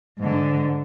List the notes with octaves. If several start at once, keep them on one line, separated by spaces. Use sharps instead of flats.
G#2 D3